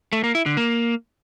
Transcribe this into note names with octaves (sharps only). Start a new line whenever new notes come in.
A3
A#3
E4
D3
A#3